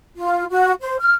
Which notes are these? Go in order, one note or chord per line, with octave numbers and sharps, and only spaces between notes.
F4
F#4
C5
F6